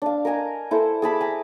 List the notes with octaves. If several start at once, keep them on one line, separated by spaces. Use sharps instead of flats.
D4 F5
A#4 D#5 G#5 A#5
E4 A4 C5
G#4 A5 B5 D6
G#5 A#5